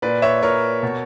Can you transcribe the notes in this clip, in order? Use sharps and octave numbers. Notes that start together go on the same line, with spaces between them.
A#2 B4 D5
C#5 E5
A#2 A#4 C#5
B2